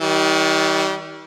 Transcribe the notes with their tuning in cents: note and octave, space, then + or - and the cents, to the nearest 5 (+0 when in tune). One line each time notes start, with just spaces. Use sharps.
D#3 +35 G3 -25